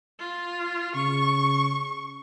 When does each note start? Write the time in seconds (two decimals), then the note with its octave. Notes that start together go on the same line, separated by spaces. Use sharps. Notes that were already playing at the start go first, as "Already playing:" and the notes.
0.20 F4
0.95 C#3 C#6